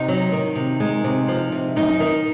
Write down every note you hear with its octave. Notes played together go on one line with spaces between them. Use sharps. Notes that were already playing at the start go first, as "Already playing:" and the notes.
Already playing: C3 D#4
F#3
D#3
C3
G#3
C3
F3
C3
F#2 D#4
D#3